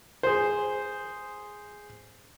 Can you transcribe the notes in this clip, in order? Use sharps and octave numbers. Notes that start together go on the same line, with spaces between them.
G#4 C5